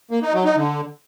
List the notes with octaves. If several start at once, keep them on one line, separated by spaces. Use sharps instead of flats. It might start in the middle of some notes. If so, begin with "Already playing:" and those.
A#3
D#4
F#3
D#4
D3